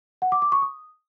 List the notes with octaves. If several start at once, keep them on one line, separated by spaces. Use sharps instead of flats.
F#5
D6
D6
C#6
D#6